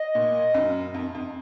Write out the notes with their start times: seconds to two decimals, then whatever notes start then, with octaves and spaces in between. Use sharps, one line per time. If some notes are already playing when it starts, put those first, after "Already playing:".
Already playing: D#5
0.15 A#2
0.54 F#2
0.94 F2
1.15 F2